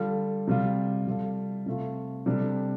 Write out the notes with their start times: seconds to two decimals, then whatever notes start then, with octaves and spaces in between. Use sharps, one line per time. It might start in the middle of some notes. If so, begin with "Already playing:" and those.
Already playing: D3 G3 F4 A4
0.47 C3 G3 F4
1.07 G3 F4 A4
1.66 C3 A3 F4
2.26 C3 G3 D4 A4